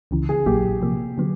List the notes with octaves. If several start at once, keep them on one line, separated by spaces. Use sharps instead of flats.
C#2 C#3 E3
G#4
A#1 A#2 F#3 A#3 G4
C3 F3 A#3
D3 F#3 B3